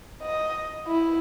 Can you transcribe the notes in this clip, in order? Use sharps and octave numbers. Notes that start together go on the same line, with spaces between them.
D#5
E4